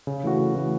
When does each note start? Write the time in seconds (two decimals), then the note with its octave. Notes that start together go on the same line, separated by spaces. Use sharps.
0.07 C#3
0.23 E3 A3 F#4
0.39 C#3
0.54 E3 A3 F#4